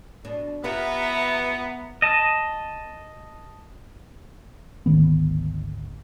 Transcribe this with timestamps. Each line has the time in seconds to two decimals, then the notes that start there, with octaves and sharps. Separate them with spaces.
0.25 B2 D4
0.64 B3 F4 G4 B4 E5 A#5
2.02 D#5 A5
4.86 G#1 D2 D#3 B3